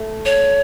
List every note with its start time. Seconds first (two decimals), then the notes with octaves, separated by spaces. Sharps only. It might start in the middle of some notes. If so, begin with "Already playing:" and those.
Already playing: A3
0.25 C#5